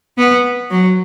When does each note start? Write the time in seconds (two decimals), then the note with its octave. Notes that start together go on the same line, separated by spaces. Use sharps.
0.18 B3
0.70 F#3